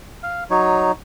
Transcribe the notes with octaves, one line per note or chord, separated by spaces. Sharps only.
F5
F#3 D#4 C#5